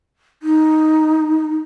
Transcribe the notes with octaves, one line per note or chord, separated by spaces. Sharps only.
D#4